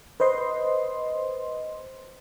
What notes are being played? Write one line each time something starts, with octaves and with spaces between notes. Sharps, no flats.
B4 C5 D#5 C6